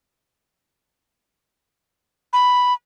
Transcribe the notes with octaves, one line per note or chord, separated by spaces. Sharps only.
B5